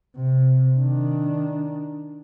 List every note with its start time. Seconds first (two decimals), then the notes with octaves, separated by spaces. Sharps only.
0.16 C3
0.79 D#3 D4